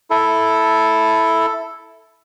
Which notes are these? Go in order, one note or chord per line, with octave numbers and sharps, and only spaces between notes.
E4 A4